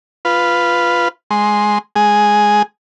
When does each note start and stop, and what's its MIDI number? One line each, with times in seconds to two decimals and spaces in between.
0.25 1.08 65
0.25 1.08 71
1.31 1.78 56
1.31 1.78 84
1.96 2.62 56
1.96 2.62 68